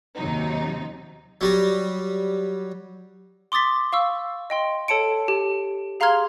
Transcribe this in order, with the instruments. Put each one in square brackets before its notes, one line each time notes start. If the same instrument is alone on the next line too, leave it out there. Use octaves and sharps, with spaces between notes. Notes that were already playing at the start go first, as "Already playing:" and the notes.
[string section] D#2 C3 F#3 D#4
[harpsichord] F#3 G3 A#5
[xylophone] C6 D6 D#6 A6 B6
F5 C#6 E6
D#5 G5 C6
A4 C#5 A5 C#7 D7
G4
G#4 F5 A#5 C6 F6 G#6